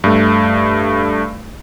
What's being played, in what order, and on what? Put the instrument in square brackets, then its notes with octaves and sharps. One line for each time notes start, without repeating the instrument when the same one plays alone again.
[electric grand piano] G2 A3